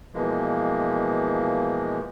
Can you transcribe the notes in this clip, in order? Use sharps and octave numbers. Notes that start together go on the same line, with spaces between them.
B2 E3 F3 G#3 A#3